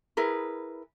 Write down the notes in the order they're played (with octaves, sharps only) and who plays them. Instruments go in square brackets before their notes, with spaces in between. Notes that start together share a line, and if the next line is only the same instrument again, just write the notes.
[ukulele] E4 G#4 A#4 B4